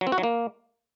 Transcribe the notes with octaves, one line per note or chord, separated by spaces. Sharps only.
F#3
C4
F#4
F#3
A#3